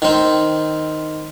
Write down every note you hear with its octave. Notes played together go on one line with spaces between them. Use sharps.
D#3 C4